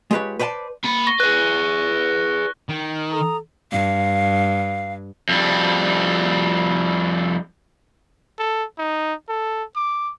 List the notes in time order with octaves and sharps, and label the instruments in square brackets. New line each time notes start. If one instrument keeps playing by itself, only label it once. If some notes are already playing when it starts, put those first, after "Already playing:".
[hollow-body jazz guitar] G#3 F4 G4 B4 C#5
B4 C5 D5 F5 A5
[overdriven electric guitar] A#3 B5
[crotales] C#6 A#6 G7
[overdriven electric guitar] G#4 B4 [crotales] F#6
[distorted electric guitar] D#3
[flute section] A4 A#5 D#6
[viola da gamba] G2 [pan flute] F5
[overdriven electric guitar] F2 G3
[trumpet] A4
D#4
A4
D6